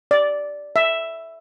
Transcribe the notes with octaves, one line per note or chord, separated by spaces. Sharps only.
D5
E5